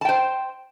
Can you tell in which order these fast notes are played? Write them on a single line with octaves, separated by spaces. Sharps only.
A5 G5 C5